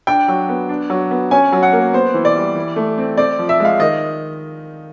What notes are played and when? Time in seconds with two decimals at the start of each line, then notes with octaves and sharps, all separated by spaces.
0.07 D4 G5
0.28 F#3
0.49 B3
0.69 D4
0.90 F#3
1.11 B3
1.31 C#4 G#5
1.52 F#3
1.63 F#5
1.72 A#3
1.93 B3 C5
2.14 E3
2.25 D5
2.36 G3
2.56 E3
2.76 A3
2.98 C4
3.17 C4 D5
3.39 F3
3.49 E5
3.60 G#3 F5
3.80 D#3 D#5